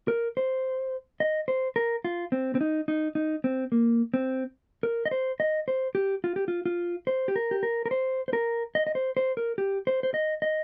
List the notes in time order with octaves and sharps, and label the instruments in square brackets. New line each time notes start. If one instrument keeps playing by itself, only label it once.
[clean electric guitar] A#4
C5
D#5
C5
A#4
F4
C4
C4
D#4
D#4
D#4
C4
A#3
C4
A#4
D#5
C5
D#5
C5
G4
F4
G4
F4
F4
C5
G4
A#4
G4
A#4
A#4
C5
C5
A#4
D#5
D#5
C5
C5
A#4
G4
C5
C5
D#5
D#5